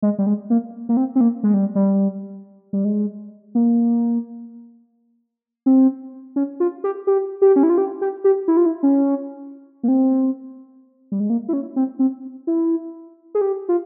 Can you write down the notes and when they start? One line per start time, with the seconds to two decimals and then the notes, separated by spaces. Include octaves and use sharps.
0.02 G#3
0.19 G3
0.26 G#3
0.50 A#3
0.89 A#3
0.97 C4
1.16 C4
1.21 A#3
1.43 G#3
1.54 G3
1.75 G3
2.73 G3
2.84 G#3
3.55 A#3
5.66 C4
6.36 C#4
6.60 F4
6.84 G4
7.07 G4
7.42 G4
7.56 C#4
7.63 E4
7.70 F4
7.78 G4
8.01 G4
8.24 G4
8.48 E4
8.57 F4
8.66 E4
8.83 C#4
9.83 A#3
9.88 C4
11.12 G3
11.20 G#3
11.30 A#3
11.49 E4
11.53 C#4
11.76 C4
11.99 C4
12.47 E4
13.35 G#4
13.41 G4
13.69 F4